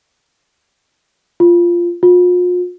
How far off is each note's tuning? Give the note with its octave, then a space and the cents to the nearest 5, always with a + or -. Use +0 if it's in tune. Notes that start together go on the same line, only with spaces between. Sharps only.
F4 -10
F4 +40